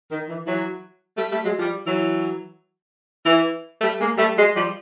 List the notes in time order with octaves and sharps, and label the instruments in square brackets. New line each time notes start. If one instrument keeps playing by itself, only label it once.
[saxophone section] D#3
E3
E3 F#3
G3 A3
G3 A3
F#3 G#3
F3 G3
E3 F#3
E3
G3 A3
G#3 A#3
G3 A3
F#3 G#3
F3 G3